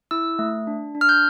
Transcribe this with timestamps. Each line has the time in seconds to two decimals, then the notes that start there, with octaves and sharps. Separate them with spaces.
0.11 E4 E6
0.39 A3
0.67 D4
0.95 D4
1.01 F6
1.09 G6